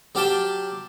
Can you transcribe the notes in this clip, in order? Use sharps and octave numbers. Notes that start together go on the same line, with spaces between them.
F#3 G4 F5 G5 A5